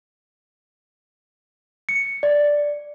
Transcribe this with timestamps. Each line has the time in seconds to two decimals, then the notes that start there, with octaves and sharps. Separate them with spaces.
1.89 C#7
2.23 D5